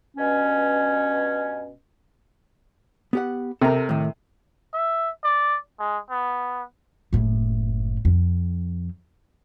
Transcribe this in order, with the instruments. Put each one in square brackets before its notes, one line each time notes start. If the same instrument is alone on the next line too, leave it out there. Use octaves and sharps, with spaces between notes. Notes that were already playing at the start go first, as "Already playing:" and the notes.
[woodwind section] G2 B2 C#4
[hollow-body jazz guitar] B3 G4 F#5
[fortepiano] C3 A#4 [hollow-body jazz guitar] A4 A#5
[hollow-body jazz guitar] A2 D#3
[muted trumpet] E5
D5
G#3
B3
[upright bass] F#1 A2
F2